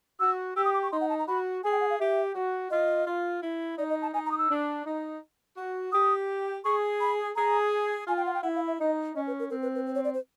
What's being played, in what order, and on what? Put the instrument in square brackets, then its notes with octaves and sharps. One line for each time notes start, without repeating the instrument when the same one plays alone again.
[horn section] F#4 [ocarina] E6
[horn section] G4 [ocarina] E6
[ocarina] D#6
D6
C#6
[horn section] D#4 [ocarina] C6
[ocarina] F#5
A5
A#5
[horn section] F#4 [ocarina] B5
[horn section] G#4 [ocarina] G#5
[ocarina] G5
F#5
F5
[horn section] G4 [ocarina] E5
[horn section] F#4
[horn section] F4 [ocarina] D#5
[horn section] F4
E4
[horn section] D#4 [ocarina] D5
[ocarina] D#5
A5
[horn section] D#4 [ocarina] G#5
[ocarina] A#5
D#6
E6
[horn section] D4
D#4
F#4
[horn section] G4 [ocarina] D#6
[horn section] G#4 [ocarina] C#6
[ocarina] B5
[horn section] G#4 [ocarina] A#5
[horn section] F4 [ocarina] G#5
[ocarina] G5
F#5
G5
[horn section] E4 [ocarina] F#5
[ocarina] F5
E5
[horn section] D#4 [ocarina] D#5
[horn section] C#4 [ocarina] D#5
[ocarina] B4
A#4
[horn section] C4 [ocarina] A#4
[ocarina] B4
B4
C5
C#5
D5
C5